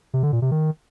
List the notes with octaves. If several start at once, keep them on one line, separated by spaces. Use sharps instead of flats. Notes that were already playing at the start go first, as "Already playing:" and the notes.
C3
D3
A#2
C3
D#3